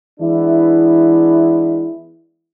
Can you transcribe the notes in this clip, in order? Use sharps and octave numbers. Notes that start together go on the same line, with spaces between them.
E3 G#3 B3 D4 E4